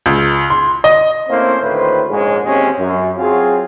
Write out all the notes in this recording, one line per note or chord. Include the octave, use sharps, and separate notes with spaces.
C#2
C6
D#5
A3 A#3 C4 C#4 E4 C5
D2 A2 D#3 B4 C5
A#1 G#2 G#3 C#4
A1 D#2 G#3 C4 C#4
F#2
F#3 C4 F4 F#4 G#4